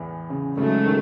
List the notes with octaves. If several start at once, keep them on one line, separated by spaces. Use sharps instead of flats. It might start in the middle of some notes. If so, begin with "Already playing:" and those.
Already playing: E2 A2 E3
C#3
G#2 C#3 F#3 A3
D#3